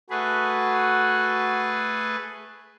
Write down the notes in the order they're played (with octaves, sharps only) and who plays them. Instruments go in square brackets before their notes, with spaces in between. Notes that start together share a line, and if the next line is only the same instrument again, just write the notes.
[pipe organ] A3 G#4 B4 [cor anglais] F#4